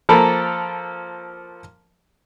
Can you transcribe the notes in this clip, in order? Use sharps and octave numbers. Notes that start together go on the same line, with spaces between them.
F3 A#3 A4 A#4 A5 B5